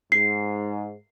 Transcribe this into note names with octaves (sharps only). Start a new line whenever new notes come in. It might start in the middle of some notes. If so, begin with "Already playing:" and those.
G#2 C7